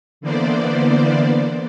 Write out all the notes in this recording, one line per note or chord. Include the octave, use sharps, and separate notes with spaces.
D3 E3 A#3 B3 C5 D5